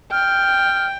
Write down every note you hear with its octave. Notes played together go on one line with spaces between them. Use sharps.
G5 F6